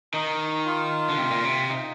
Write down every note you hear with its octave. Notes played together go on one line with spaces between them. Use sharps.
D#3 D#4
F4
D3
C3
A#2
C3
D#4